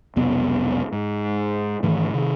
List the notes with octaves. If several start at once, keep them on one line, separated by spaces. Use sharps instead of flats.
B1 F2 C3 B3
G#2
G#2 D#3 E3 A3
C3 D#3